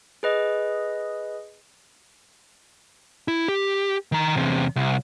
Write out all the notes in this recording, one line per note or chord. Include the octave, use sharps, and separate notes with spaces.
G#4 B4 D#5
E4
G4
D#3 A#5
E2 C3
C2